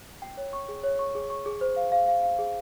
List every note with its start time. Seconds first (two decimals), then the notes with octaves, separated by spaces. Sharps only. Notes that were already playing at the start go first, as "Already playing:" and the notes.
0.22 G5
0.37 C#5
0.53 C#6
0.69 G#4
0.84 C#5
0.99 C#6
1.15 G#4
1.30 C#6
1.46 G#4
1.61 C5
1.76 F5
1.92 F5
2.08 F5
2.23 F5
2.39 G#4